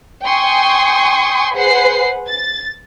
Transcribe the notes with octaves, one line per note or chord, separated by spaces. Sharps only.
G5 G#5 C6 C#6 D#6
G#4 B4 C5 F#5 C7
A6